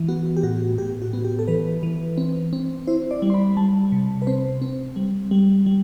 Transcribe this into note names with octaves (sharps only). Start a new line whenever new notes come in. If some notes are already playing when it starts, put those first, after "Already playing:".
Already playing: E3
B3 F#4
G4
A2 F#4
A2 G4
F#4
B3
G4
A4
E3 B4
E3
C4
C4
E4 C5
D5
G3
C6
B5
G3 A5
C3
B4
C4 C5
C4
G3
G3
G3